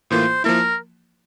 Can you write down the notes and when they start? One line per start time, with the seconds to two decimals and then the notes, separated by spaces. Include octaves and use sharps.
0.11 A2 E3 A#3 F4 C5
0.44 F3 A#3 E4 A#4